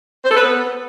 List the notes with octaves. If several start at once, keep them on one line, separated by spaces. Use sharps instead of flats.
C5
A4
B4
B3